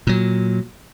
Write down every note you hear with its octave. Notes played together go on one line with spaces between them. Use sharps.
A#2 F#3